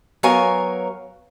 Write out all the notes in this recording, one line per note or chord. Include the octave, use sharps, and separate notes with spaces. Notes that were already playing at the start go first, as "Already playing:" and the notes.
F#3 B3 A#4 C#5 F5 G#5